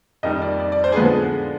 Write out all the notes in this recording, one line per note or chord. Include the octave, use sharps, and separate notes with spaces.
F2 D#3 G3 D#5
D5
D5
D5
C5
G#4
D3 F3 G#3 B3 B4
G#4